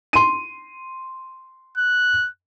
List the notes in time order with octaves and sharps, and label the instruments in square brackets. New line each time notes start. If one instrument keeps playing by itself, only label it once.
[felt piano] C6 D#7
[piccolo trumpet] F#6